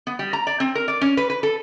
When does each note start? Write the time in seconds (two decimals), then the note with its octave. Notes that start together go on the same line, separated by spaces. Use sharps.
0.07 B3
0.19 G3
0.33 A#5
0.47 D5
0.60 C4
0.75 A#4
0.88 D5
1.01 C#4
1.17 B4
1.30 B4
1.43 A4